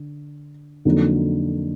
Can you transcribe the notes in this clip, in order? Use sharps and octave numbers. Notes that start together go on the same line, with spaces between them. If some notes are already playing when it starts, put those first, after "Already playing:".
Already playing: D3
F2 D3 F#3 A#3 D#4